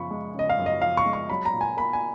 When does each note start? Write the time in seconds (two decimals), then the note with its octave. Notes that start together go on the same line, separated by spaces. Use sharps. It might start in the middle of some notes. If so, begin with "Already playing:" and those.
Already playing: F#2 C#3 F3 B5 C#6
0.11 G#3
0.35 C#3 D#5
0.49 F5
0.58 F#2
0.66 D#5
0.82 F3 F5
0.97 C#6
1.06 G#3
1.13 C#6
1.30 F#3 B5
1.45 A#5
1.53 A#2
1.61 G#5
1.77 A#3 B5
1.93 G#5